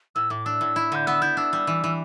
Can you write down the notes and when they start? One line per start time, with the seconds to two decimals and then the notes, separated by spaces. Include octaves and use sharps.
0.15 A2 E6
0.30 A2 D6
0.46 D4 E6
0.61 A2
0.76 E4
0.92 D3 G6
1.07 B3 E6
1.22 E4 G6
1.37 D4 E6
1.53 G3
1.67 E3
1.84 E3